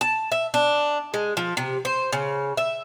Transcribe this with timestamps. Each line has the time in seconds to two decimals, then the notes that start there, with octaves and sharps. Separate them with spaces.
0.01 A5
0.32 E5
0.54 D4
1.14 G#3
1.37 F3
1.57 C3
1.85 C5
2.12 C#3
2.57 E5